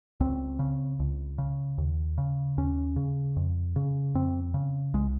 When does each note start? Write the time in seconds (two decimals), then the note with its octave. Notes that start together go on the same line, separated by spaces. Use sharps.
0.20 C#2 C4
0.59 C#3
0.99 C#2
1.38 C#3
1.78 D#2
2.18 C#3
2.57 D#2 C#4
2.96 C#3
3.36 F2
3.76 C#3
4.15 F2 C4
4.54 C#3
4.94 C2 G#3